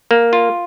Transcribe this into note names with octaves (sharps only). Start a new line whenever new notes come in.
A#3
F4